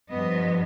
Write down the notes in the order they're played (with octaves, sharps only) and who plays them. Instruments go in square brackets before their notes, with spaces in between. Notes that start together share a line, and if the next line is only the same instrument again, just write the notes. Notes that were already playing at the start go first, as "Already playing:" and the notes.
[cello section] G2 F3 B3 D#5